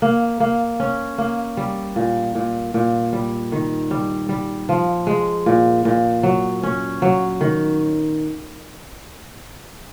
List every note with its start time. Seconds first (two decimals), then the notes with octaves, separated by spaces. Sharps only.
0.02 A#3
0.40 A#3
0.80 C#4
1.18 A#3
1.57 G3
1.96 A#2
2.35 A#2
2.74 A#2
3.13 G3
3.52 D#3
3.91 G3
4.29 G3
4.69 F3
5.07 G#3
5.46 A#2
5.85 A#2
6.23 F#3
6.63 C#4
7.02 F#3
7.41 D#3